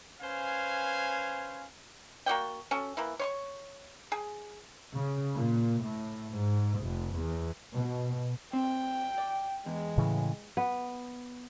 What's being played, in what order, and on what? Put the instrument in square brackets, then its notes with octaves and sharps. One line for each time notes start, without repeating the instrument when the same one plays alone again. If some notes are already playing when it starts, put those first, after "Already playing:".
[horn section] C#4 B4 C5 F5 G#5
[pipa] A#3 F#4 D5 G5
C#4 F#4 A4
E3 A#3 E4
C#5 C6 C#6
G#4
[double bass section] C#3
A#2
A2
G#2
F1
E2
B2
[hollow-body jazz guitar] C4 [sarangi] G5
[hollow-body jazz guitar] D5
[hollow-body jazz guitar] E2 [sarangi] G#3
[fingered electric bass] A2 C#3 E3
[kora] B3